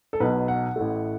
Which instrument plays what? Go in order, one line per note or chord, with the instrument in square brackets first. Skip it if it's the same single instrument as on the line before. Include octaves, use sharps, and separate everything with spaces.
[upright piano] A4
B1 B2 F#3 B4
F#5
A1 A2 A3